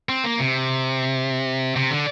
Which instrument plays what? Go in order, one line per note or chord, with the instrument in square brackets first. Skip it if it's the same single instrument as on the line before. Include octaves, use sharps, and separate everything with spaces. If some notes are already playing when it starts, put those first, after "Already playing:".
[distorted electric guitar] C4
A#3
C3
C3
D3